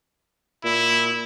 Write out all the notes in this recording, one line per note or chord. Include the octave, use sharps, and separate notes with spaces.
A#2 E4